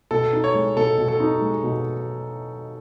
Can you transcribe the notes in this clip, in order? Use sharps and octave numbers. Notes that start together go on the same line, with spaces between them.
B2 A4
D#4
C#5
G#3
B2 A4
B2
A4
D#4
G#3
B2